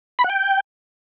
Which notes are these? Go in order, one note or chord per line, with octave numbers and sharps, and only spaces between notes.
B5
F#5
G5